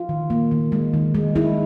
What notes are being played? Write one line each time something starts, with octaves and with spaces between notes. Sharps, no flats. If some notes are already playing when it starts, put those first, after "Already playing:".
Already playing: F4
D#3
A#3
D#3
G#3
D#3
G#3
G#3 E4